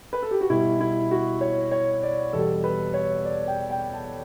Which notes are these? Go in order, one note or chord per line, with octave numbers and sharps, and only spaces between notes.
B4
A4
G4
F#4
B2 G3 E4
E4
F#4
C#5
C#5
D5
E2 B2 G3 A4
B4
C#5
D5
G5
G5
A5